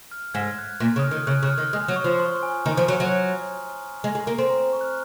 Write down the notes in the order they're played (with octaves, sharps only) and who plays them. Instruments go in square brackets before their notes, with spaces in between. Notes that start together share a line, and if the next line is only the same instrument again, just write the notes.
[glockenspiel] F6
[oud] G#2 [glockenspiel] G#6
[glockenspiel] F#6
[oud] A#2
C#3
[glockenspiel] D#6
F6
[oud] D#3
[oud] C#3 [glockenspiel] F#6
[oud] C#3
[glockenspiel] F6
[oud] D#3
[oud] G#3 [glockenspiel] D#6
[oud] F#3
[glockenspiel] C#6
[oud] F3
[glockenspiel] C6
C#6
C6
G#5
[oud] D#3 [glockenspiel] A#5
[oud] F3
F#3
F#3
G#3
G#3
A#3
C4
[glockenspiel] A#5
A#5
C#6
F#6
F6